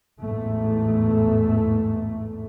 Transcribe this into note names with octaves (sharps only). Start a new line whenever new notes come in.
A1 E2 G#2 A3